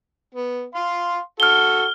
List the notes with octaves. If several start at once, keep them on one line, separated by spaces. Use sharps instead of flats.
B3
F5 C6
F#4 A4 F6 G7